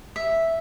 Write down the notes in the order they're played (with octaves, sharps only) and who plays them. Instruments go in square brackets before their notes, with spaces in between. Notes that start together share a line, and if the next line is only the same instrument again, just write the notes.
[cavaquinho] E5